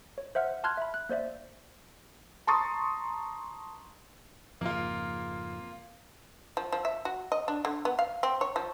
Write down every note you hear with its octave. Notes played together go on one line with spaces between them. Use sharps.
C#5
C5 E5 F#5 F6
A5 C6 F6 F#6 G#6
E5 B5
F#6
A#3 C5 D5 E5
A5 A#5 C6 C#6 D#6 A6
F2 G#2 C#3 A#3 F4
F3
F3
E5
F#4
D#5
D4
D3
B3
F5
C4
C#5
F3